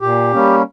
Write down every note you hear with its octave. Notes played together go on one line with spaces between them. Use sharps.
A#2 G4
G3 A#3 C#4